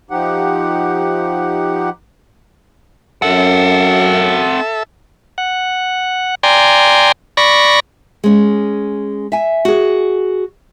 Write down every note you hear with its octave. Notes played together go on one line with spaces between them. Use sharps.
F3 D#4 G4 F#5
F#2 C4 A4 E5 F#5
F#5
D5 G5 G#5 A#5 C6
D5 B5 C#6 A#6
G#3 C#4
E5 G#5
F#4 G#4